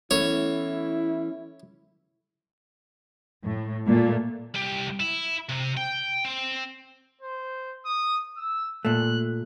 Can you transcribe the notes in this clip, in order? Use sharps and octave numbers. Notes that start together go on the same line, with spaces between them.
E3 A3 B3 C#4 E4 C#5
A2
A#2 A3
C2 G4
E4
C3
G5
C4
C5
D#6
E6
A#2 A3 F#6